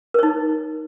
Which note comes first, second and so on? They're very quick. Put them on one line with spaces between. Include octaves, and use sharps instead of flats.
A#4 C#5 D#4